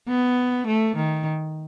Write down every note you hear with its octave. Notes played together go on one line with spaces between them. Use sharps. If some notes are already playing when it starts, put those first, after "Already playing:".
B3
A3
D#3